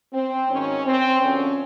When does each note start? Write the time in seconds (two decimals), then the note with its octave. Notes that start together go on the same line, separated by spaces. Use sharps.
0.13 C4
0.49 G#2 D#3 F#3 C#4
0.86 C4
1.21 F#2 D3 F3 C#4